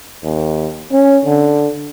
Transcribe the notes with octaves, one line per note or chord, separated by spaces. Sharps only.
D#2
C#4
D3